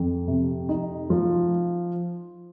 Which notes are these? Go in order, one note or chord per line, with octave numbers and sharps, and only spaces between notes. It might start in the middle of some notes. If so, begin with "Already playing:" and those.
Already playing: F2
C3
D#4
F3